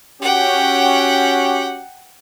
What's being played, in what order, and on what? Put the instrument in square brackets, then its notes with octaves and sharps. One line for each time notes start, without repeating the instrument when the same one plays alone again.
[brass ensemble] C#4 F#4 G4 [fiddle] F#5 G5